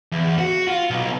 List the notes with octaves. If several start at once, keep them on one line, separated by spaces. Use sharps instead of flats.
E2
F#4
F4
B1